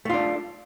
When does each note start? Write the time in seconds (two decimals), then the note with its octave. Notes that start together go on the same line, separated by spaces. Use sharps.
0.05 A3
0.09 F4
0.14 D4